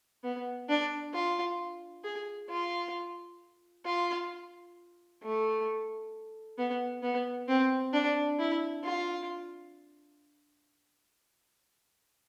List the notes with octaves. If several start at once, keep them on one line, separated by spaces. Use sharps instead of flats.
B3
D4
F4
G#4
F4
F4
A3
B3
B3
C4
D4
E4
F4